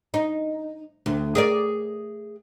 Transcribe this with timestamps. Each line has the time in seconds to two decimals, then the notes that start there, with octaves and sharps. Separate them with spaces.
0.14 D#4
1.06 D2
1.35 G#4 A#4 D5